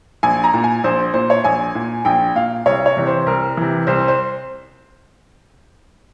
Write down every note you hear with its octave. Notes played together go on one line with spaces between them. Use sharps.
A#1 G#5
A#5
A#2
G#5
A#1 C5
A#2 C5
C#5
A#1 G#5
A#2
A#1 G5
A#2 F5
C2 C#5
C#5
C3 E3
C5
C2 A#4
C3 E3
C2 C5
C5